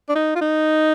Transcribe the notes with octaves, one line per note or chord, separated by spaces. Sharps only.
D4
D#4
F4
D#4